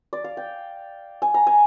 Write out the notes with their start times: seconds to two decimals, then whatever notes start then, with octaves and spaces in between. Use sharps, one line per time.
0.13 D5
0.24 F5
0.37 G5
1.22 G#5
1.34 A#5
1.47 G#5